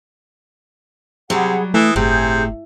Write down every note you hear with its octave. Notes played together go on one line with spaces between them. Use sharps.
C3 F#3 G3 G#4 F#5 B5
E3 A3 D#6
G1 A2 C3 G#4 G6